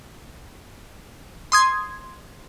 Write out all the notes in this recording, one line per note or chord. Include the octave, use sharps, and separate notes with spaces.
C6 D#6 G#6